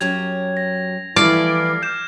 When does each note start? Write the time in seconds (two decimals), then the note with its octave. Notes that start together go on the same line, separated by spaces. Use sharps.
0.01 F#2 F#3 G4 G#6 F7
0.57 A#6
1.16 E3 F3 G3 A3 E4 D5 F6 C7
1.82 F6 G6 E7